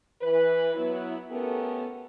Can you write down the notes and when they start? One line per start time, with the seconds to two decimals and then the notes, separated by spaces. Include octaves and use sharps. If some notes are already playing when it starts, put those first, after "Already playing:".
0.22 E3 B4
0.75 F#3 B3 E4
1.30 A3 B3 C#4 G4 A4 A#4